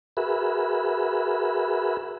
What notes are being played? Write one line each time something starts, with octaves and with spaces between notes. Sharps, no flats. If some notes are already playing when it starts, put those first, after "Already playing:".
F#4 G#4 A#4 B4 E5 B5